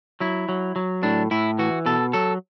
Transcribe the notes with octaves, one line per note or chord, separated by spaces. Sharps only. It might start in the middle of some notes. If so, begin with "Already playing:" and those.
F#3 E4
F#3
F#3
A2 D4
A2 E4
E3 F#4
B2 A4
F#3 A4